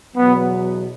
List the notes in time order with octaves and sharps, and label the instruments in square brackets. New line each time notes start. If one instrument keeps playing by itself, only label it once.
[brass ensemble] E2 B2 F#3 B3